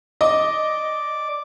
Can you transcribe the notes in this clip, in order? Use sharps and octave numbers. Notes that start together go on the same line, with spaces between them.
D5 D#5 D6